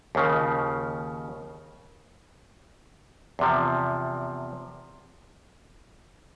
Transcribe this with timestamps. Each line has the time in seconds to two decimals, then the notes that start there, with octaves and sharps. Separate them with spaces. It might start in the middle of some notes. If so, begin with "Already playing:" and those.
0.15 D#2 C#3 F3
3.39 E2 C3 F3